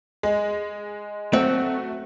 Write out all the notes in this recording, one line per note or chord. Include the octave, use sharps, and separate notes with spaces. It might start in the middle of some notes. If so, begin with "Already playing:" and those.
G#3
F#3 A3 C4 F#4